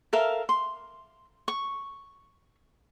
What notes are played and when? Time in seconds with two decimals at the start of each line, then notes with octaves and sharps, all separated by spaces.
0.13 A4 A#4 E5 F5
0.49 C6
1.48 C#6